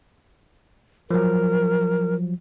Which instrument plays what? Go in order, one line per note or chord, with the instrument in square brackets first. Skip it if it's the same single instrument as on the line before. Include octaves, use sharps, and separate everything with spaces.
[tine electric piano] F3 F#3 [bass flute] A#4